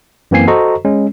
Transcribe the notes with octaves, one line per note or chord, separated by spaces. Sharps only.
F#2 E3 A#3 C4 G#5 C7
F#4 A4 C5 D#5 A#5 C#6
G#3 C#4